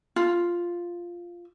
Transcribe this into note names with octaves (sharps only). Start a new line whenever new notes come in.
F4